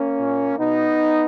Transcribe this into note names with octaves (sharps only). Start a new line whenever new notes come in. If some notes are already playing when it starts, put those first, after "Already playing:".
Already playing: A#3 C#4
A#2
B2 B3 D#4